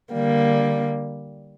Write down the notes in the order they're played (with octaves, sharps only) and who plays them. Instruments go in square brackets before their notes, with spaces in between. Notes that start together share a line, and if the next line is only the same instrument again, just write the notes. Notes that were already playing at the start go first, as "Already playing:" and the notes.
[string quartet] D3 G3 A#3